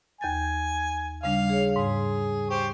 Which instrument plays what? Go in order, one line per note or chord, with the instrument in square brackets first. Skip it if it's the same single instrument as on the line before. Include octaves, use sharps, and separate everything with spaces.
[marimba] D#2 G6 A6 [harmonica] G#5
[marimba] C#3 G3 D4 [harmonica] F5
[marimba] G#4 C#5
[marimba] G#2 [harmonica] G#4
[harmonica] G4 C5 C#6